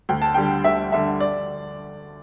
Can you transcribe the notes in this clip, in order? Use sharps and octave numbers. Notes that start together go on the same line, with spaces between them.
D2 G5
A5
D3 G3 G5
D2 E5
D3 G3 E5
D5